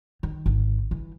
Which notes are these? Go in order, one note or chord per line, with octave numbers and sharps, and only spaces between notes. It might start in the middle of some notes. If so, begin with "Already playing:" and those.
D#3
G#1
E3